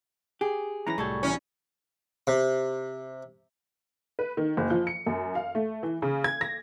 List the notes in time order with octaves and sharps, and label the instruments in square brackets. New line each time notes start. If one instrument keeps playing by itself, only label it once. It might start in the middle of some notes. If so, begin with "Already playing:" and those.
[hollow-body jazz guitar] G4 [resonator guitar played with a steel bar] G#4
[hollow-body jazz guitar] F#2 E3 C#4 [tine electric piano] A#5 B5 A#6
[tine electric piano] C2 A2 G#6 [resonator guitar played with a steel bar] F#3 G3 [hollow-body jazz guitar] A3 G#4 A4
[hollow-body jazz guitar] E2 A#2 E3 [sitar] C#4
[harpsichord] C3
[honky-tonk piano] B4
D#3
F#1
F3
C#7
F#2
F5
A3
E3
C#3
G#6
A#6